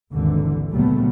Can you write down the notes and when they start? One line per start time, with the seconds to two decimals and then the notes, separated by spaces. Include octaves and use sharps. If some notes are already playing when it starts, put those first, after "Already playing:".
0.11 G#1 D#2 D3 E3
0.72 C#2 A#2 F#3 G3 A3 B3